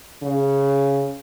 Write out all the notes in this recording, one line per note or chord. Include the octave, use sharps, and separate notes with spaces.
C#3